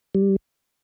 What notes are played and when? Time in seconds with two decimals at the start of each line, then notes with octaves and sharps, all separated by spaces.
0.15 G3